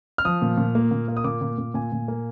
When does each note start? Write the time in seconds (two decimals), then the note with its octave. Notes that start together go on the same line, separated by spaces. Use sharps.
0.18 F6
0.25 F3 D#6
0.42 A#2
0.57 A#2
0.75 A#3
0.91 A#2
1.08 A#3
1.17 D#6
1.24 A#2 D6
1.41 A#2
1.58 A#2
1.74 A#2 G#5
1.92 A#2
2.08 A#3